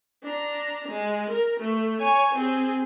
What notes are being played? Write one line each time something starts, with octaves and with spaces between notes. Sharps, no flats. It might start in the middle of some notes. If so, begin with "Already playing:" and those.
D4 A#5
G#3
A#4
A3
C#5 G#5
C4 G#4